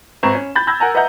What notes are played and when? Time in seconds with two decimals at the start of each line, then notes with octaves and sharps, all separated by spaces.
0.23 G#1 C4 B4 A#5 C#6 E7
0.35 C#4
0.55 B5 G6 A6
0.67 B5 E6 G6 G#6 A#6
0.80 A#4 F#5 G#5 A#5
0.95 B4 D#5 E5 F#5 A#5 G6